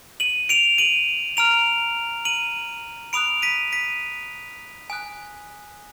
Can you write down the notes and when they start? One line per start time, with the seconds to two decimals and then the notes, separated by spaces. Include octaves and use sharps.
0.20 D#7 F#7
0.49 D7 F7
0.78 D#7 F#7
1.37 A#5 F6 D7 F7
2.25 D#7 F#7
3.13 B5 D#6 F#6 D7 F7
3.42 B6 D#7
3.72 B6 D#7
4.90 G#5 D#6 F#6